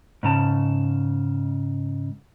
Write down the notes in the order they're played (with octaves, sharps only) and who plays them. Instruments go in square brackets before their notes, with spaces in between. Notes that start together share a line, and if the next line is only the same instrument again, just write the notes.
[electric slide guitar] G#2 C#3 A5